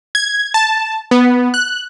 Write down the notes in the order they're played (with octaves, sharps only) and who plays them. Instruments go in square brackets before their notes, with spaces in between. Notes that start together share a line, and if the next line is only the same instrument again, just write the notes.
[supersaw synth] G#6
A5
B3
F#6